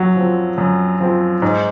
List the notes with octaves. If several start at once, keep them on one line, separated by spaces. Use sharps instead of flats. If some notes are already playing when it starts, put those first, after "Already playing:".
Already playing: F#2 F#3
F3 C4
F#2
F3 C4
G#2